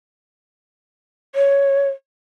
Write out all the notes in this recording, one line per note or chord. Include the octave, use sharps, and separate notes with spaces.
C#5